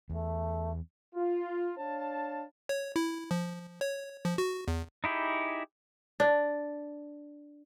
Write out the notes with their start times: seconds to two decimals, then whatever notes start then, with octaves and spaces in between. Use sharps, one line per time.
0.10 E2 A3
1.15 F4
1.77 D4 C#5 F5 A5
2.69 C#5
2.96 E4
3.31 F3
3.81 C#5
4.25 F3
4.38 F#4
4.68 E2
5.04 D#4 E4 G4 G#4
6.20 D4